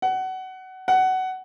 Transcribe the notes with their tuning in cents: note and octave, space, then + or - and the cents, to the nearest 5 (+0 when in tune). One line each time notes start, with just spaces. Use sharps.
F#5 +25
F#5 +20